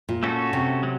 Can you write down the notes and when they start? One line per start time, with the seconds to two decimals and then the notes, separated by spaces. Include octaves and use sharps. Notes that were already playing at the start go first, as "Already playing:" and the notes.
0.09 A#2
0.23 A3 C#4 F#4 A4
0.53 C3
0.83 F#3